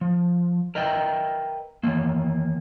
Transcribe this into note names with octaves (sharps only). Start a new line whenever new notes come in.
F3
A#4 B4 D#5 E5 G5
D#3 E3 A#3